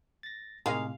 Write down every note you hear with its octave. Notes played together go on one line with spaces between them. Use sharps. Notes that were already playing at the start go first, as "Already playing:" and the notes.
A6 A#6
A2 C3 D#3 G#3 G#4 F5